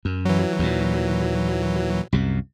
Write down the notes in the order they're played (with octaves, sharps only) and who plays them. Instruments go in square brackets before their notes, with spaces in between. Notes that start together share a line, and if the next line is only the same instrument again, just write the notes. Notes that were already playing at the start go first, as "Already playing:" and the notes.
[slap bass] F#2
[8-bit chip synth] E3 F#3
[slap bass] D#2 A#2
C2 F#2 C3